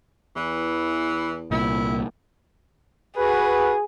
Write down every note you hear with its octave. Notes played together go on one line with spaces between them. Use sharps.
E2 E3
C2 A#2 E4
F#4 G#4 B4